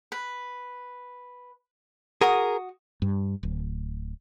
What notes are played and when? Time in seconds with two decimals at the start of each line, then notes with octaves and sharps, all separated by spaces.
0.12 B4
2.21 F#4 G#4 A#4 D#6
3.02 G2
3.43 D1